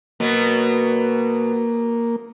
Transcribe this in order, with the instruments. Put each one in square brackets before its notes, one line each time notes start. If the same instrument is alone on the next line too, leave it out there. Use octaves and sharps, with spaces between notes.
[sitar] B2 F#3 [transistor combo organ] A#3